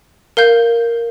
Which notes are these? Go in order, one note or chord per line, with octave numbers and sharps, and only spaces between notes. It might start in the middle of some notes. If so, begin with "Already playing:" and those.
A#4 F5 G6